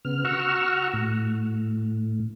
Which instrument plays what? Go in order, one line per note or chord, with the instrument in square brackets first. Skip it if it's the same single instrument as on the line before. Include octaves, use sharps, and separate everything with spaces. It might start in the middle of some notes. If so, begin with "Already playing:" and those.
[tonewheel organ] C#3 B3 F6
F#4 F#5 A#5 C#6 E6 F6
A2